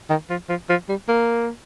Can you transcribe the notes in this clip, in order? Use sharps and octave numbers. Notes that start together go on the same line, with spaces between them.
D#3
F3
F3
F3
G3
A#3